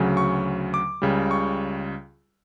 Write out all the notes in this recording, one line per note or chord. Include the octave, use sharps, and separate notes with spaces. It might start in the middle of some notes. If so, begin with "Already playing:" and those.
Already playing: D2 C#3 F#3
C#6
D6
C#2 C#3 G3
C#6